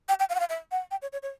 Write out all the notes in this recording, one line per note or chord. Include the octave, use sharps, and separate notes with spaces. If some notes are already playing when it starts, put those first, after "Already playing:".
G5
G5
F5
F#5
F5
E5
F#5
G5
C#5
C#5
C#5